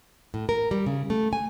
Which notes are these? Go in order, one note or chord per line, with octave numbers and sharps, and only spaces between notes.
A2
A#4
G3
C#3
A3
G#5